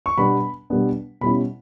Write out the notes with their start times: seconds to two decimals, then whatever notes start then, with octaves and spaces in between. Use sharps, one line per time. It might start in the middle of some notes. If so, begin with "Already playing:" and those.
0.06 C#6
0.17 B2 G3 B3 D4 B5
0.70 B2 G3 B3 D4
1.21 B2 G3 C#4 E4 B5